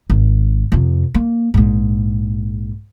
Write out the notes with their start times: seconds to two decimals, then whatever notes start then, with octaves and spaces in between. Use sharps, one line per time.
0.10 G#1
0.72 F2 C3
1.14 A#3
1.54 A#1 G#2